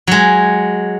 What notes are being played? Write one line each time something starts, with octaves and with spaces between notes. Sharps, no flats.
F#3 G#3